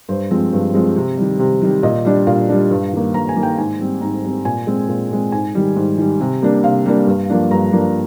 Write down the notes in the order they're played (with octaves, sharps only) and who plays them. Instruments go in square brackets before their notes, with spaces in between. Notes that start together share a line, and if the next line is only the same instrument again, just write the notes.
[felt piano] G2 C5
F3 G#3 C4
G2
F3 G#3 C4
C3
D#3 G3
C3
D#3 G3
A#2 D#5
G3 D4
A#2 F5
G3 D4
G2
D#3 A#3
G2 A#5
G#5
D#3 A#3
G5
G#2 G#5
G3 C4
G#2 A#5
G3 C4
A#2 G#5
G#3 C4
A#2
G#3 C4
G#2 G#5
D#3 G3
G#2
D#3 G3
C3
G3 A#3 D4
C3 F5
G3 A#3 D4
G2
F3 A#3 D4
G2 A#5
F3 A#3 D4